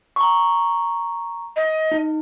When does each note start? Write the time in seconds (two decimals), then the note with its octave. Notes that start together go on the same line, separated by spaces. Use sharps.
0.16 A#5 C#6
1.56 D#5
1.92 D#4